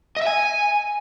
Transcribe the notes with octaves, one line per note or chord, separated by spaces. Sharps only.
D#5
E5
G#5